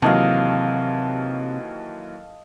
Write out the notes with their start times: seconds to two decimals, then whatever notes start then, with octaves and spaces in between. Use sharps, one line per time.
0.02 D#2 C3 E3 F#3 A4 D#5 F5